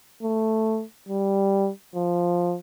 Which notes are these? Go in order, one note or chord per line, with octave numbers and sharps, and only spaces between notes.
A3
G3
F3